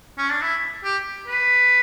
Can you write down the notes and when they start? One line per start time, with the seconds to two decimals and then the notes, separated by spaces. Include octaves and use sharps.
0.18 C#4
0.30 D4
0.42 E4
0.84 G4
1.28 B4